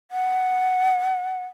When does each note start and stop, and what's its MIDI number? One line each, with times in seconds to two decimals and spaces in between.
0.11 1.45 78